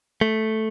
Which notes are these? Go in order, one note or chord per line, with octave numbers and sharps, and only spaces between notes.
A3